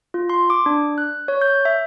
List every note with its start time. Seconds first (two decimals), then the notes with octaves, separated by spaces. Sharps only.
0.14 F4
0.30 C6
0.50 D6
0.66 D4
0.98 F#6
1.28 C#5
1.41 G6
1.65 E5